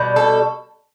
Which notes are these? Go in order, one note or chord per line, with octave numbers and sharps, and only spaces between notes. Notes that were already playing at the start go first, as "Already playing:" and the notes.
Already playing: B2 G3
A4